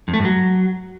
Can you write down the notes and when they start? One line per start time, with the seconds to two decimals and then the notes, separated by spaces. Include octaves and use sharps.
0.08 F2
0.13 A3
0.19 G2
0.25 F#3